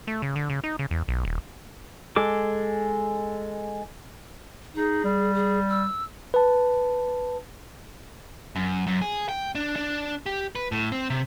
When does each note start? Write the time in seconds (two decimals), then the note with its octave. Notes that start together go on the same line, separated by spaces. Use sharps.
0.07 A3
0.22 C#3
0.36 D3
0.50 C#3
0.64 D#4
0.79 C#3
0.91 E2
1.08 B1
1.25 D#1
2.16 G#3 A4 D6
4.76 D#4 G#4
5.04 G3
5.34 G#4
5.69 E6
6.34 B4 A5
8.56 F#2
8.87 F#2
9.02 G#4
9.29 G5
9.55 D4
9.76 D4
10.26 G4
10.55 B4
10.72 A2
10.92 C4
11.10 C3